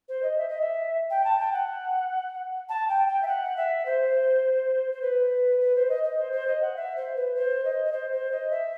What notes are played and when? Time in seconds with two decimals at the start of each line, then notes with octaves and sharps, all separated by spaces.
0.08 C5
0.22 D#5
0.37 E5
0.49 D#5
0.60 E5
1.10 G5
1.24 A5
1.39 G5
1.52 F#5
2.69 A5
2.88 G5
3.07 G5
3.22 E5
3.27 F#5
3.56 E5
3.85 C5
4.92 C5
5.01 B4
5.60 B4
5.75 C5
5.88 D#5
6.03 D#5
6.17 C5
6.32 C5
6.47 D#5
6.61 F#5
6.76 E5
6.96 C5
7.16 B4
7.35 C5
7.64 D#5
7.85 D#5
7.92 C5
8.12 C5
8.31 D#5
8.50 E5